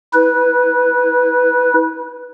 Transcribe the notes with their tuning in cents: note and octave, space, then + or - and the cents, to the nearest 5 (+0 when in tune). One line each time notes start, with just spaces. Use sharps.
E4 -30 B4 +0